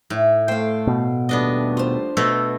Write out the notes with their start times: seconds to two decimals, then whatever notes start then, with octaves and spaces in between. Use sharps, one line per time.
0.10 A2 E5
0.48 A3 C5 F5 G5
0.87 B2
1.29 D#2 G3 A3 B3 D4 D#5
1.77 F4 C5
2.17 B2 A3 A4